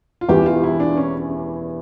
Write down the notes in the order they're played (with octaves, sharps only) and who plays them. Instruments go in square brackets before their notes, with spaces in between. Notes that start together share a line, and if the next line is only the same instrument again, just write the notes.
[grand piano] F4
[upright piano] E1 E2 E3 G3 [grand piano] G4
[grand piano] F4
E4
D4
C#4